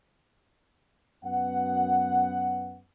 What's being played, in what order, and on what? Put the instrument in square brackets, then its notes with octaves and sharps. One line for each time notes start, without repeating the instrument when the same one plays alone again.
[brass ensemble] F#2 B3 F#5